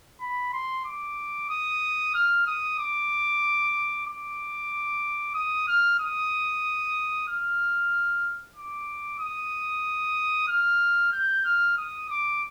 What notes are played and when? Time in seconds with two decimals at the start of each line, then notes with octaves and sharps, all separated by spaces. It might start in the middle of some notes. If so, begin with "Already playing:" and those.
0.21 B5
0.53 C6
0.85 D6
1.50 D#6
2.14 F6
2.47 D#6
2.79 D6
4.06 D6
5.34 D#6
5.68 F6
6.00 D#6
7.28 F6
8.56 D6
9.20 D#6
10.48 F6
11.12 G6
11.45 F6
11.78 D#6
12.10 D6